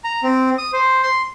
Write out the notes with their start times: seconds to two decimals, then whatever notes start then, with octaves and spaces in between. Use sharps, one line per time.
0.04 A#5
0.23 C4
0.58 D#6
0.73 C5
1.03 C6